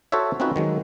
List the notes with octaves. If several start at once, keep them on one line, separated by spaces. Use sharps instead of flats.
F#4 A4 C5 C#5 E5
C4 C#4 D#4 F4 F#4 B4
D#3 F#3 G#3